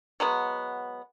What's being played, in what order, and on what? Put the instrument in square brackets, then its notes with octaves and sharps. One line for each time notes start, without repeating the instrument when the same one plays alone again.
[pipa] F#3 G#3 B3